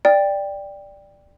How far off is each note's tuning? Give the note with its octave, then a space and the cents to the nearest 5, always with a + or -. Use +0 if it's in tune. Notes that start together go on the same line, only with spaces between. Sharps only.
D5 +0 G5 +10